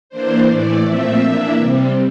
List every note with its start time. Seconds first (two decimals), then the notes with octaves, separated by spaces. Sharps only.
0.10 E3 A#3 D4 C5
0.47 A2 E3 A3 D5
0.84 A#2 F3 A3 C4 E5
1.22 E3 A#3 D4
1.58 C3 G3 C4